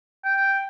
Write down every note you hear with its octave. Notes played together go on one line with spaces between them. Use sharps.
G5